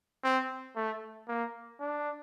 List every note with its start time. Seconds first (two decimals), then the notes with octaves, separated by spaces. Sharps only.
0.23 C4
0.76 A3
1.28 A#3
1.80 D4